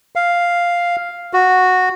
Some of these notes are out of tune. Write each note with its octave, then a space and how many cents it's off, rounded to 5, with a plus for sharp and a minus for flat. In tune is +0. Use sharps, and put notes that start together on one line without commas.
F5 +0
F#4 -5